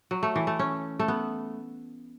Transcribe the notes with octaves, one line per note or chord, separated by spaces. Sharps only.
F#3
A3
E3
A3
C#4
A3
B3